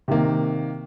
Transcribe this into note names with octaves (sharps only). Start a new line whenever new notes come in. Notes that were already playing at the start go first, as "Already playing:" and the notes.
C3 D#3 A#3